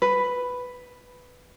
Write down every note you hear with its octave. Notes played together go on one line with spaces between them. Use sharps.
B4